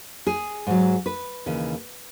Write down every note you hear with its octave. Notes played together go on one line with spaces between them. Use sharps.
G#4
G#2 F#3
B4
D#2 C#3 E3